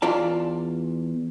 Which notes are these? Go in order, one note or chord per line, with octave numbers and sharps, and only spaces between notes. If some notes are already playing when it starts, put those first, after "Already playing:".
E2 F4 D5 A5